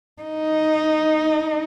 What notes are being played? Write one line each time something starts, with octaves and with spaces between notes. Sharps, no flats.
D#4